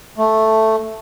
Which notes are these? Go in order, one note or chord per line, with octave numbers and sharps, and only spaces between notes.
A3